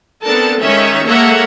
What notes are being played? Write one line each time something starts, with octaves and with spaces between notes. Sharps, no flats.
B3 C4 D4 A4 A#4 A5
D#3 G#3 C#4 C#5 E5
G#3 A#3 A4 C#5 E5 F#5